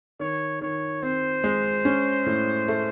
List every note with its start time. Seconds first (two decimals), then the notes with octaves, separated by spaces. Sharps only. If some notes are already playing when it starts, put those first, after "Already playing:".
0.20 D#3 C#5
0.61 D#3 C#5
1.03 C4 C5
1.44 G#3
1.85 C#4
2.26 A2
2.68 A3